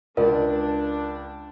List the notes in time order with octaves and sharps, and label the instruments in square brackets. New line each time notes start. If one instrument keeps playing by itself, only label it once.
[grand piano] C#2 D5 [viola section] D4 [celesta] A#4